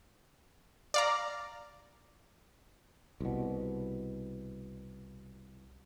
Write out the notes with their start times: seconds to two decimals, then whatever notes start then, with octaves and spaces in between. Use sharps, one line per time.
0.94 D5 F5 A#5
3.21 C2 B2